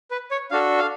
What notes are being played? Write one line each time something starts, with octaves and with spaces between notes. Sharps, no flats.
B4
C#5
D4 F#4 A4 F5
F5